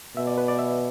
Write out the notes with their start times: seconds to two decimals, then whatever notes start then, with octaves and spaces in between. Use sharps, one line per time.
0.16 B2 E5
0.27 D5
0.38 B4
0.48 D5
0.59 E5